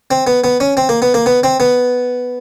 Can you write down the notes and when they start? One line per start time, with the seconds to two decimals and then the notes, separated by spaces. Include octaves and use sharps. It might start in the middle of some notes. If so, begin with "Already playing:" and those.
0.11 C4
0.27 B3
0.44 B3
0.60 C#4
0.77 C4
0.89 A#3
1.02 B3
1.14 A#3
1.26 B3
1.44 C4
1.60 B3